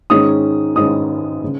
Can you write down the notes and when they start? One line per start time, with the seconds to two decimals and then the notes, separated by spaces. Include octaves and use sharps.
0.10 G#2 D#3 G#3 C#4 D#6
0.76 G#2 D#3 G#3 C#4 D#6
1.44 C#3